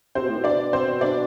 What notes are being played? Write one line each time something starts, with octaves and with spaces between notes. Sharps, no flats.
C3 C4 C5
B2
A2
B2
D4 D5
C4 C5
D4 D5